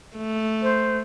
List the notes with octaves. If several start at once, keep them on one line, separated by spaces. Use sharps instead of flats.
A3
C5